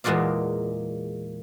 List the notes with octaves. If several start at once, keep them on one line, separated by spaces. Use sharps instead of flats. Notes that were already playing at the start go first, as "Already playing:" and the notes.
E2 A#2 G#3 F#4 D5 F5